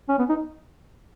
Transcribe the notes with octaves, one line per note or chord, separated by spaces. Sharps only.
C#4
B3
D#4